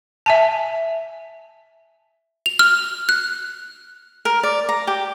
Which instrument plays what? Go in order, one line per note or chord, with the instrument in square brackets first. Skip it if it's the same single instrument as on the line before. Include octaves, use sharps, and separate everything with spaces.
[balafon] E5 G#5 A5
[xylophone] F7
F6
F#6
[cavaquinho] A#4
D5
A#5
G4